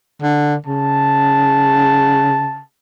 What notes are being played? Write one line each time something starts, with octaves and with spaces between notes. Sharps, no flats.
D3
C#3 A5